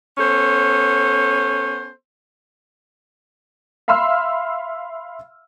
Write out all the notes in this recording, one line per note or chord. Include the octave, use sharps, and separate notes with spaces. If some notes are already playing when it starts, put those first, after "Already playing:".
B3 C#4 A4 C5
E5 F5 B5 C6 E6 F6